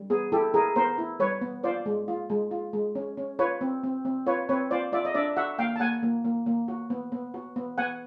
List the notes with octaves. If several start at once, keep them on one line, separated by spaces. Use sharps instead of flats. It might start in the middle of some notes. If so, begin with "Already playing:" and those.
Already playing: G3
B3 G#4
E4 G4 A4
E4 G#4 A#4
B3 A#4 C5
E4
G3 B4 C#5
B3
F4 C5 D5
G#3
F4
G#3
F4
G#3
C#4
C#4
F4 B4 C#5
C4
C4
C4
F4 B4 C#5
C4 B4 C#5
F4 C5 D5
F4 D5 E5
D#5
D4 D5 E5
F#4 E5 F#5
A#3 F5 G5
A5
A#3 F#5 G#5
A#3
A#3
A#3
F#4
B3
B3
F#4
B3
B3 F#5 G#5